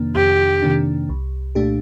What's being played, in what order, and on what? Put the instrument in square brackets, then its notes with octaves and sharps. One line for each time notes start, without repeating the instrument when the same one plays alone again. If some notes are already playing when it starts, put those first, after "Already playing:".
Already playing: [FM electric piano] F2 C3 D#3 A#3 D4
[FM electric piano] F2 [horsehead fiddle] G4
[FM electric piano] C3 D#3 A#3 D4
C2
A#2 A3 D4 G4